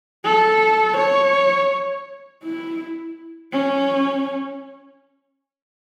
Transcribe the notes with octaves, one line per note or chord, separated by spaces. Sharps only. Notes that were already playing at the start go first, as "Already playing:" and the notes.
A4
C#5
E4
C#4